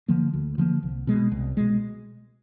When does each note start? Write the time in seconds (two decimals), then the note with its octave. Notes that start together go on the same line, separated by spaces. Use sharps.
0.08 D3 F3 A#3
0.33 D2
0.58 D3 F3 A#3
0.83 C2
1.07 B2 G#3
1.32 C2
1.57 B2 G#3